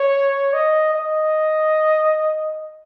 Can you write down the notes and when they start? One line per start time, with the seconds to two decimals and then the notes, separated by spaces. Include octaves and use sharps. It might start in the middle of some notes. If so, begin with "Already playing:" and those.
Already playing: C#5
0.53 D#5
0.94 D#5